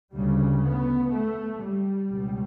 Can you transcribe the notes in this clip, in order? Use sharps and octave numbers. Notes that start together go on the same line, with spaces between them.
D2 C#3 G3
B3
A3
G3
C#2 B2